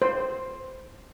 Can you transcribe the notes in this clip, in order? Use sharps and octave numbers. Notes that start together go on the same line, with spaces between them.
C5